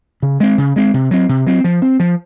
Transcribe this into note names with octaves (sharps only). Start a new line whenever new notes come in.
C#3
G#3 C4
C#3
G#3 C4
C3
F#3 C4
C3
F#3 C4
F3
C4
F3